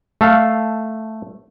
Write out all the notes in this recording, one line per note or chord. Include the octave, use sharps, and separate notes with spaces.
A3 A4 F5